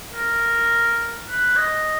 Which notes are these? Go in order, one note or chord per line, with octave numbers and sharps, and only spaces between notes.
A#4
B4
D#5